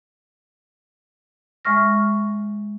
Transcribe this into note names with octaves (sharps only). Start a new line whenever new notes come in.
G#3 E5 C#6 F6 A#6